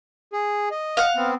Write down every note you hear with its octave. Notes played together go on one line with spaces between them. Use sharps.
G#4
D#5
F5 F#5
B3 C4